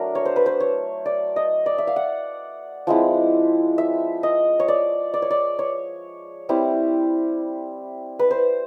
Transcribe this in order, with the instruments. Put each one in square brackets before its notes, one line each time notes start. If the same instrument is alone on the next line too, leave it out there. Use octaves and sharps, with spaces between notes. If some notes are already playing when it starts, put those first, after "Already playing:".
Already playing: [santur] F#3 A3 D4 A#4
C#5
C5
B4
C5
C#5
D5
D#5
D5
E5
F5
F#5
F3 G#3 C4 E4
E5
D#5
C#5
D5
D5
C#5
D5
C#5
G3 C4 E4
B4
C5